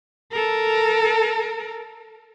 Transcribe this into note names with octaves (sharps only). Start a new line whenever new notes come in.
A4 A#4